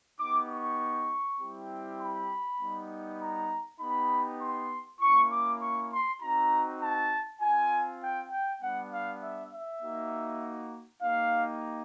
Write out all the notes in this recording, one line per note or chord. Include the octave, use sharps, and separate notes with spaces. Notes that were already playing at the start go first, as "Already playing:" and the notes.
B3 D#4 G4 D6
C#6
G3 C4 E4 G4
B5
G3 B3 D#4
A#5
B3 D#4 G4 B5
C6
A#3 C#4 E4 C#6
D6
C#6
C6
C4 D#4 F#4 A#5
A5
C4 F4 G#5
G5
G5
G3 B3 D4 F#5
F5
E5
E5
A#3 D#4 F#4
A#3 D#4 G4 F5